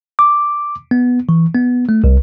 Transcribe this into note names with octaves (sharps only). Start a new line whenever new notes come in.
D6
B3
E3
B3
A3
C2